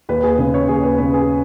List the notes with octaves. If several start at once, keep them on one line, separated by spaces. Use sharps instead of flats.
D#2 B4
G#4
C#3 B4
C#5
D#2 G#4
B4
C#3 B4
G#4